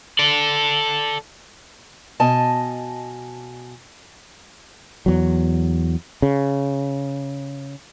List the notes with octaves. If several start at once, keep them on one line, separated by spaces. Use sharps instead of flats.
A4 D5
B2 D#5 G#5 A5
E2 F#3
C#3